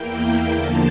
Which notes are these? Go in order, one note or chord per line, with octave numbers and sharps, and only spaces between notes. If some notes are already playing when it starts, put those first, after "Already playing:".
Already playing: E2 E3 A#3 G5
E2 D3 F3 A#3 A5